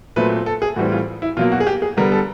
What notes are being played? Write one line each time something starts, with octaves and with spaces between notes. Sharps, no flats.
A#2 F#3 A3 C4 B4
A4
G#4
A2 E3 G3 C4 F#4
F4
E4
B2 F#3 A#3 F4
F#4
G#4
G4
G#4
D3 G3 B3 A#4
A4